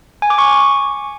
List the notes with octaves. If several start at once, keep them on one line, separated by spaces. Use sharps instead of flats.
G#5
D6
C#6